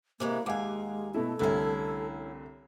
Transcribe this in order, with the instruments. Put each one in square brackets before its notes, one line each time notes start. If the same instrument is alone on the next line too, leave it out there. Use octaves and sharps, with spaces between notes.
[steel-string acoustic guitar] C3 E3 G#3 [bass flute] A#3
[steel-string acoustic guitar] D#2 G#5 [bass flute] G#3 [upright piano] F5 F#5 D6
[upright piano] B2 A3 E4 [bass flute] A4
[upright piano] C2 D3 A3 [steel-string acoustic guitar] C#4 E4